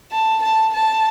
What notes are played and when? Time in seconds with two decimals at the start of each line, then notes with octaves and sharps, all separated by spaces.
0.11 A5
0.42 A5
0.73 A5